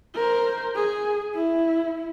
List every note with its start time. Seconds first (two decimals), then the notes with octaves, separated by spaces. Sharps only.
0.15 A#4 C5
0.75 G#4
1.35 E4